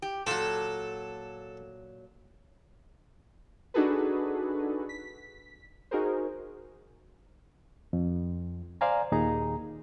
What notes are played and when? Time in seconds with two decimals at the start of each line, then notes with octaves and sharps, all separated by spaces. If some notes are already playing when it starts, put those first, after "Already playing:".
0.02 G4
0.27 A#2 F#3 A4
3.74 D4 D#4 F#4 G#4 A4 B4
4.89 B6
5.91 D#4 F#4 G#4 A#4 C5
7.93 F2
8.81 C5 D5 F5 G#5 A#5
9.12 D#2 A#2 D#4 G#4 A#5